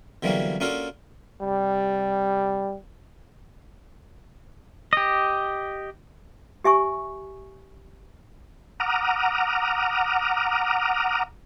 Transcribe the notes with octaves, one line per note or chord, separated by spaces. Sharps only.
B2 D3 E3 F#3 G3 A#3
A#3 C#4 D4 F4 F#4 A4
C3 G3
G4 D#5
G4 E5 G#5 C#6
F#5 A#5 D6 D#6 F6